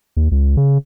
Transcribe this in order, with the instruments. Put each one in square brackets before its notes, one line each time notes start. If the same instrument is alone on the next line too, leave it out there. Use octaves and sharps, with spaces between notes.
[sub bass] D#2
C#2
C#3